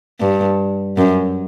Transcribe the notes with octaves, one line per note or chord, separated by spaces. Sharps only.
G2
F#2